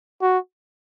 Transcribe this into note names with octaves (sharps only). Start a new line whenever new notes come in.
F#4